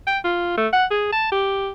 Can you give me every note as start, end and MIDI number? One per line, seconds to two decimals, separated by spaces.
0.07 0.18 79
0.24 0.53 65
0.57 0.67 57
0.73 0.85 78
0.91 1.10 68
1.12 1.31 81
1.32 1.70 67